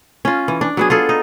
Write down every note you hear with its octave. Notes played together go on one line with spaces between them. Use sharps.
C#4 F4
E3
D4
F#3 B3 G#4
F4 G#4 A4
D#4